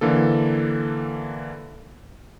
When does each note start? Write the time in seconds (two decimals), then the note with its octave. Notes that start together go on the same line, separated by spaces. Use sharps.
0.01 D3 E3 A#3 A4